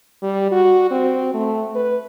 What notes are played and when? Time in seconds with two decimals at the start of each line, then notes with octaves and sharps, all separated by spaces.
0.22 G3
0.52 F#4
0.91 C4
1.34 A3
1.75 B4